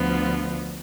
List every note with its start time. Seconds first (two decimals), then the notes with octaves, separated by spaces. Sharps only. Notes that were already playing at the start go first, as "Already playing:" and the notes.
Already playing: D2 D3 F3 B3 F4